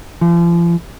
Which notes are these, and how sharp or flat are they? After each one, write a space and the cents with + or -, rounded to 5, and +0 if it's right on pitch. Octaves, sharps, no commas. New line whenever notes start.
F3 -40